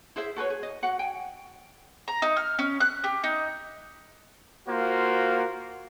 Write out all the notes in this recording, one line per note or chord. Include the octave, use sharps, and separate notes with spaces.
E4 G#4 C5 E5
F#4 A4 B4 C#5
G#4
D#5
F#4 F#5
G5 G#5
A#5
D#4
F6
C#4
F#6
G4
D#4
A#3 F4 F#4 C5